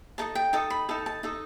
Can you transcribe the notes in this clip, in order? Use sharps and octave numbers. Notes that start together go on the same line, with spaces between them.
D#4 A4 D#5 A5
G5
D#4 A4 D#5 A5
B5
D#4 A4 D#5 A5
A5
D#4 A4 D#5